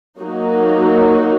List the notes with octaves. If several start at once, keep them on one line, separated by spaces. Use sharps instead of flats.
F#3 A#3 D#4 F#4